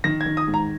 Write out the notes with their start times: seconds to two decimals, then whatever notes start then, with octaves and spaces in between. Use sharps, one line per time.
0.04 D#3 A#6
0.21 G#6
0.26 D#3
0.37 D#6
0.48 G#2
0.54 A#5